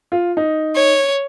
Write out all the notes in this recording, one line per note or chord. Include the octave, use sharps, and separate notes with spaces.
F4
D#4
C#5